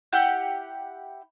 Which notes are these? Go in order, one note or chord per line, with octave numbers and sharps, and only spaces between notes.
E4 G4 F#5 G6